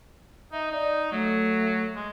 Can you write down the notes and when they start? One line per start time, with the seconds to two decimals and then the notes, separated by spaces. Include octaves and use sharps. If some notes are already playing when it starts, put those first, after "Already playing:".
0.53 D#4 E5
0.72 D#4 D5
1.12 F#3 A3
1.96 G#3